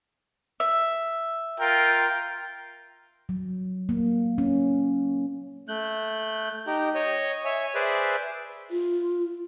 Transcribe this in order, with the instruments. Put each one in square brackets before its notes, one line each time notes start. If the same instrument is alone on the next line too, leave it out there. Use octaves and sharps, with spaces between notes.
[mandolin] E5
[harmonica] F4 A#4 G5
[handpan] F#3
A#3
C#4
[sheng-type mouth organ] A3 F#6 G6
D#4 G4
C#5 D#5
C#5 E5 G#5
G#4 B4 C5 D5 E5
[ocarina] F4